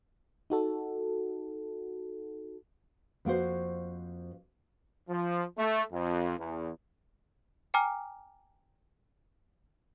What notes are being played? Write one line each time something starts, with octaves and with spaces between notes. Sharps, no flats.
D#4 F#4 A4
F2 A#3 F#4 C5
F3
A3
F2
E2
G5 G#5 A#5 D6 F6